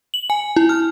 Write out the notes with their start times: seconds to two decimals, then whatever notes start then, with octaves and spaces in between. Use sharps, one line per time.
0.14 F#7
0.30 G#5
0.56 E4
0.69 F6